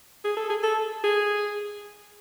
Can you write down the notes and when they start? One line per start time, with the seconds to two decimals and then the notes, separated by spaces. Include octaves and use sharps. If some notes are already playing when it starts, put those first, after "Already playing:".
0.25 G#4
0.37 A4
0.50 G#4
0.63 A4
1.04 G#4